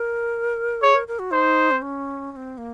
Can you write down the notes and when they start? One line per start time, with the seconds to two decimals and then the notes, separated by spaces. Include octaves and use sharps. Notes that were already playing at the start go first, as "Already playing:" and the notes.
Already playing: A#4
0.82 G#4 C#5
0.95 A#4
1.08 A#4
1.19 F#4
1.32 D#4 C5
1.71 C4
1.82 C#4
2.32 C#4
2.36 C4
2.58 A#3